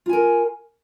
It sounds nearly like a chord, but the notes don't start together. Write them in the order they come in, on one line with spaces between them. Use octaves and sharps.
F4 G#5 A#4